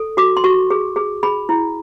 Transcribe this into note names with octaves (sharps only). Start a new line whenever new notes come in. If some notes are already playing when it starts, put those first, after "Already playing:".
Already playing: A4
F#4 D6
C6
F#4 C#6
G#4
G#4
G#4 B5
E4